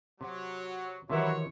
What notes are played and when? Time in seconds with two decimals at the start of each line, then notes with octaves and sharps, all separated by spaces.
0.21 C3 F#3
1.10 C3 D#3 E3 F#3 E4 C#5